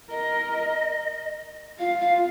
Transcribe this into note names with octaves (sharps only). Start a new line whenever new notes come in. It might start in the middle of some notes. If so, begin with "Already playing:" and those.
A#4 D#5
F4 F5
F5